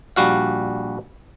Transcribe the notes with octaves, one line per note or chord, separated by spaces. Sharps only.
A#1 G3 F#4 F5